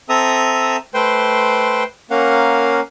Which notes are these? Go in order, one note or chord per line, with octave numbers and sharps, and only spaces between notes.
C4 A4 E5 A#5 D#6
A3 B4 C5 G5 C6
A#3 C#4 A#4 F5 F#5